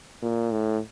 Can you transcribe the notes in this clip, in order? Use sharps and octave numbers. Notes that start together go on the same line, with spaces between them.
A#2
A2